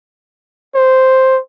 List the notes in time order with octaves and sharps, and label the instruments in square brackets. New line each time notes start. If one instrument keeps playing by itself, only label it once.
[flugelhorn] C5